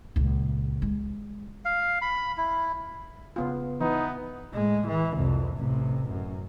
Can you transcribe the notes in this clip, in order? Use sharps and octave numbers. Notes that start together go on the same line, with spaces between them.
C#2 A#2
G#3
F5
B5
E4
C#3 B3 F4
E3 B3 D#4
A2 G#3
E3
C2 F2
A1 C3
F#2